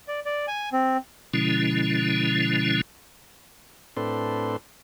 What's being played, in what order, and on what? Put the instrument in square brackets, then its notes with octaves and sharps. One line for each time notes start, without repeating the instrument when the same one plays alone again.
[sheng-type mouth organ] D5
D5
G#5
C4
[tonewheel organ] B2 D3 F3 G#3 C#4 E4
[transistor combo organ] A2 C4 D4 A4 B4 C6